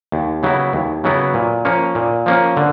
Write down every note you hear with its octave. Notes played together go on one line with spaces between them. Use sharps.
D#2
C#3 F#3 B3 E4
D#2
C#3 F#3 B3 E4
A#2
F3 A#3 C#4
A#2
F3 A#3 C#4
D3